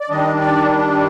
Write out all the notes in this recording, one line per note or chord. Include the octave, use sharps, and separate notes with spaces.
D5
D#3 G3 D4 D#5
D5